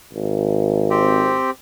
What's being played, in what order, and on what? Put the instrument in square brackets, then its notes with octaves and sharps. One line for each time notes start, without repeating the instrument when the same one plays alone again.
[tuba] G#1
[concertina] C4 G4